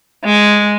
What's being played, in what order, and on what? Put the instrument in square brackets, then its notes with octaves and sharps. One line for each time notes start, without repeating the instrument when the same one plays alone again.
[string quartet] G#3